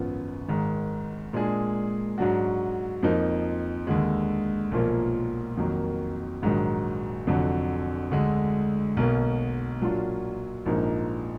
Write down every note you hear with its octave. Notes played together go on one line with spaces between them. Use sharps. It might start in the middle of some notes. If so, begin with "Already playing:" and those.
Already playing: G#1 F#2 F3 B3 F4
G#1 G#2 D#3
A#2 G#3 D4 G#4
G#2 F#3 D4 F#4
F2 F3 A#3 D#4
D#2 D3 G#3
B1 A#2 F3 A#3 F4
F2 D#3 F#3 A#3
A#1 G#2 D#3 F#3
F1 F2 D3 F#3
D2 D3 G#3
B1 B2 A#3
A#2 F#3 D4 F4
A#1 G#2 F3 A#3 D#4